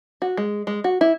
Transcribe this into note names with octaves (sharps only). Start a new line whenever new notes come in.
F#4
G#3
G#3
F#4
E4